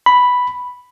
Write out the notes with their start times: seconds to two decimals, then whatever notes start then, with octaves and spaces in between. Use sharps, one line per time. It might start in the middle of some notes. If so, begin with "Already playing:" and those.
0.06 B5